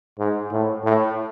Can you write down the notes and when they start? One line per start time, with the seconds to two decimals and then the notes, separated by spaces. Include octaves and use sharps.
0.19 G#2
0.52 A2
0.84 A2